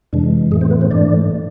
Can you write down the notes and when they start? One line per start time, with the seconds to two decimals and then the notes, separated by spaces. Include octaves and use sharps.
0.13 F2 C3 E3 G#3 D4
0.51 A2 E3 G#3 A3 G#4
0.61 C4 C5
0.71 B3 B4
0.81 C4 C5
0.91 G#2 E3 A3 D4 D5